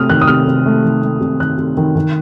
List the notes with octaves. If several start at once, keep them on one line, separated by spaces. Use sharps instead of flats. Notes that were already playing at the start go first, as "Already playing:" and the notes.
Already playing: C3 A3 D#6 F6
D#3 F#6
D#6
C3 F6
C3
A3
D#3
A3
C3
D#3 F#6
C3
D#3
D#3